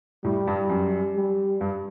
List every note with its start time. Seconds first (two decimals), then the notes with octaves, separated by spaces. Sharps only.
0.24 A2 G3
0.47 G2
0.70 F#2
1.15 G3
1.61 G2